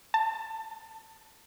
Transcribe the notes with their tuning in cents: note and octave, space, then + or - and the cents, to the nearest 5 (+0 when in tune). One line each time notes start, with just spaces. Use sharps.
A5 +25